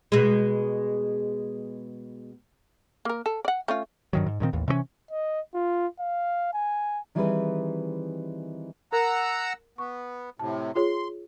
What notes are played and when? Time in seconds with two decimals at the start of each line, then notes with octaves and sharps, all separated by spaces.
0.12 B2 G#3
3.05 A#3 A#4
3.26 A4
3.45 D5 F#5
3.68 A3 C#4 F4
4.13 G2 D#3 F#3
4.26 G#2
4.40 G2 A#2 D#3 C4
4.53 A1 D#2
4.68 C3 E3 A3 C#4
5.11 D#5
5.54 F4
6.00 F5
6.53 G#5
7.15 D#3 E3 G3 C4 G#4 B4
8.93 A#4 F#5 A#5 E6
9.78 B3 C#6
10.39 A2 C3 A5
10.75 F4 G#4 C#5 C6